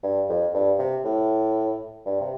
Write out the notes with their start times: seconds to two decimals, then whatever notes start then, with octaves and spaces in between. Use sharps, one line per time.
0.04 G2
0.29 F2
0.54 G2
0.79 C3
1.05 A2
2.06 G2
2.21 C3